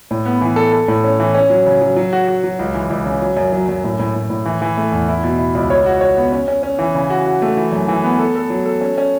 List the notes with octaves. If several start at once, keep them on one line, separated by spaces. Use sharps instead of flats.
A2
B3
E3
A4
A4
A2
C#4
E3
C#4
F#3
C#3
F#3
F#3
F#4
F#4
F#3
C#2
E3
C#2
C#3
F#3
F#2
F#3
F#2
A2
A2
A2
A2
E3
E3
A3
E2
E4
B2
E4
C#2
C#5
F#4
C#5
B3
C#4
C#4
C#4
E3
C#3
F#4
F#4
A3
E3
F#2
E3
B3
A4
A4
F#3
A4
C#4
C#4